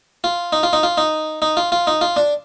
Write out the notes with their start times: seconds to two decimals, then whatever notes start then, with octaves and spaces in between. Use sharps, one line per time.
0.24 F4
0.53 D#4
0.63 F4
0.73 D#4
0.83 F4
0.98 D#4
1.42 D#4
1.57 F4
1.72 F4
1.87 D#4
2.01 F4
2.16 D4